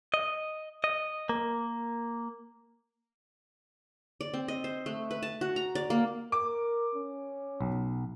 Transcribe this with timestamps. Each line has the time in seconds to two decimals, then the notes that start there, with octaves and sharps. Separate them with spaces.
0.14 D#5
0.84 D#5
1.29 A#3
4.21 D5
4.34 C4
4.48 D#5
4.64 C5
4.86 A3
5.11 B4
5.23 A5
5.41 F#4
5.56 A#5
5.75 D5
5.90 A#3
6.32 A#4 D6
6.95 C#4
7.61 B1